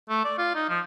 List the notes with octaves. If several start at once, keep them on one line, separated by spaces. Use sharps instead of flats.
A3
D5
F4
D#4
F3